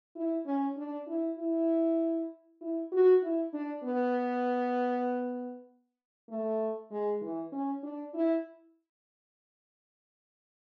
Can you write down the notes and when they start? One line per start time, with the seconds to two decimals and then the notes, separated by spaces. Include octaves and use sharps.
0.16 E4
0.46 C#4
0.77 D4
1.07 E4
1.39 E4
2.61 E4
2.92 F#4
3.22 E4
3.53 D4
3.84 B3
6.29 A3
6.91 G#3
7.22 E3
7.52 C#4
7.83 D4
8.14 E4